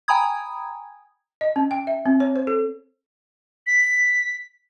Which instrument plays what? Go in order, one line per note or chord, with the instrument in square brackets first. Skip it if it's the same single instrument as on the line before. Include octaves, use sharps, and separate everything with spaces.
[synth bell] G5 G#5 A#5 B5 D#6 G#6
[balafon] D#5
C#4
G5
E5
C4
C#5
C5
A4
[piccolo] B6